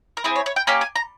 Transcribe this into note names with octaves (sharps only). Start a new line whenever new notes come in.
A#4
C4 E4 G#4 C5
C#5
C#5
G5
A#3 C#4 G4 G#5
G#5
A#5